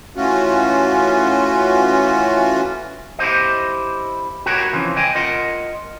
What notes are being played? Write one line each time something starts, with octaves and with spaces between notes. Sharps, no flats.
E3 A3 C#4 F4 F#4
E4 G4 C5 D#5
F#4 G4 A#4 B4 C#5
C#3 E3 F3 C4
D#5 G5 G#5
F4 A#4 D#5 F#5